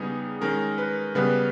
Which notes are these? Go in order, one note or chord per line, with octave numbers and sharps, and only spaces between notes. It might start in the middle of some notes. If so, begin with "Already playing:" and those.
Already playing: C#3 G3 B3 D#4 G#4
D#3 G#3 C#4 A#4
B4
C#3 G3 B3 B4